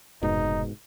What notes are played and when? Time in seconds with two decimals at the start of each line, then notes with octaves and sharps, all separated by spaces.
0.23 F1 G#2 B2 D#4